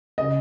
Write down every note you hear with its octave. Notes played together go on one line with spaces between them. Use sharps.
C#3 D#5